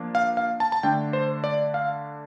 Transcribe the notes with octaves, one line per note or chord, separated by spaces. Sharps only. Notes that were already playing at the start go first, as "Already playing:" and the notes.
Already playing: F3 A#3 D4
F5
F5
A5
A5
D3 A3 D4 G5
C5
D5
F5